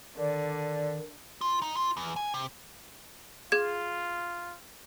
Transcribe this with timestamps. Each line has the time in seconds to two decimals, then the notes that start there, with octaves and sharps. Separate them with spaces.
0.18 D3 D#3 D5
1.41 F4
1.62 D#4
1.76 F4
1.97 E2
2.16 G#5
2.34 C3
3.52 F4 G#4 G#6